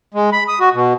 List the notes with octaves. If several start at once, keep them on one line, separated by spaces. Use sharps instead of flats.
G#3
B5
D#6
F#4
B2